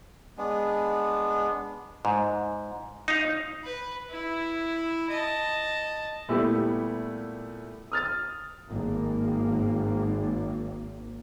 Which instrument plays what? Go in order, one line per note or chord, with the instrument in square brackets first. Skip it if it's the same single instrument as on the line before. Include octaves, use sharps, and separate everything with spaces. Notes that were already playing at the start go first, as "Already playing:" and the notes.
[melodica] G#3 B3 D4
[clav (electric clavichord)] G#2
D#4 F5
[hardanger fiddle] B4
E4
D#5 A5
[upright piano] A#2 G3 A3 B3 E4 G4
D#6 F6 A6
[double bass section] G#1 A#3